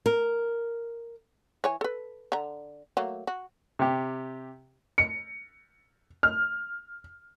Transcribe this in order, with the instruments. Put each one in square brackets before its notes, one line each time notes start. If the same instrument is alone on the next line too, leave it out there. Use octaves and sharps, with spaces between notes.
[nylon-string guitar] A#4
[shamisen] E3 C#5 G#5
A4 B4
D3 A#5
F#3 A3 A#3
F#4
[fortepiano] C3 G4
[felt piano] C#7
F6